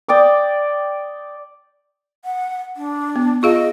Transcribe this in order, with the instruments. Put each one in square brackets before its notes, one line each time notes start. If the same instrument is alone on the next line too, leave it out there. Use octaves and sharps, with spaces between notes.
[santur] D5 G5 D6 D#6
[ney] F#5
D4
[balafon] B3
[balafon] F4 G#4 F5 [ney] D#5